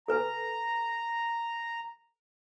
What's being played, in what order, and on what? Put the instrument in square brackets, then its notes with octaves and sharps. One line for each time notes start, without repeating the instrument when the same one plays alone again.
[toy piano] A4 B4 G#5 [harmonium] A#5